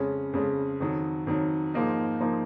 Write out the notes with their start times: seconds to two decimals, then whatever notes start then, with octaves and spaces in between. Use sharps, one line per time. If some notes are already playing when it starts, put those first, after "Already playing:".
Already playing: F2 C#3 G#3 C#4
0.33 F2 C#3 G#3 C#4
0.80 F2 D#3 F#3
1.27 F2 D#3 F#3
1.74 G#2 F3 A#3 D#4
2.20 F3 A#3 D#4